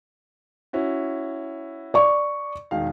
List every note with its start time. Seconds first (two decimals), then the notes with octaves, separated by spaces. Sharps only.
0.73 C#4 E4 F#4
1.94 D5 C#6
2.71 E1 D#3 F5